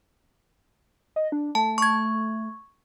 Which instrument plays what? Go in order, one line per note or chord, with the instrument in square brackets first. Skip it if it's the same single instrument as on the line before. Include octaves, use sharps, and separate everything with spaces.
[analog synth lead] D#5
D4
[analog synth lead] A3 [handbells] A5
[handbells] C#6 G#6